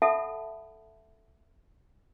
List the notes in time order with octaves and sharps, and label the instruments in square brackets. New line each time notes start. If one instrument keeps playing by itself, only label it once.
[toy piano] A4 E5 F#5 A5 B5 D#6